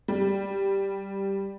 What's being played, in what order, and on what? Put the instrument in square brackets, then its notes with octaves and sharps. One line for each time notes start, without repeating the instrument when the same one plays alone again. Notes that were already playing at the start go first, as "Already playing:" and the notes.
[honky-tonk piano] G3